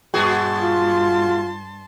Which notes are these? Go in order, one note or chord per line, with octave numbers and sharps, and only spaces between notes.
G2 A#2 F#4 G#4 A5 C6
F4